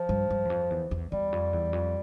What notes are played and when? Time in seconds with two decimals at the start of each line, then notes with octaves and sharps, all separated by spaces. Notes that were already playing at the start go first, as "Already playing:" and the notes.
Already playing: F3
0.09 G2
0.30 G2
0.45 E2
0.50 F2
0.70 E2
0.91 E2
1.12 E2 G3
1.32 F2
1.53 E2
1.73 F2